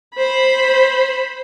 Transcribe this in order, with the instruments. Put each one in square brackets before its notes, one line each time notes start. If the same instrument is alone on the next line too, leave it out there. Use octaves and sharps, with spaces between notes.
[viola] C5 B5